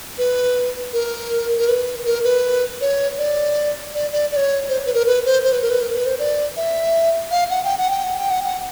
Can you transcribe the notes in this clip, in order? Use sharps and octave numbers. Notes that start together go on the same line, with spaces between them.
B4
A#4
A#4
B4
A#4
B4
C#5
D5
D5
D5
D5
C#5
C5
B4
A#4
B4
C5
C5
B4
A#4
B4
A#4
B4
C5
D5
E5
F5
F#5
G5
F#5
G5
F#5
G5
F#5
F#5